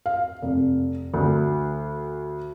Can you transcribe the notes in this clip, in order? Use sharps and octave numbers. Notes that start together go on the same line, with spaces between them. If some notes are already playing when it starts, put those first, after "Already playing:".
F5
F1
D2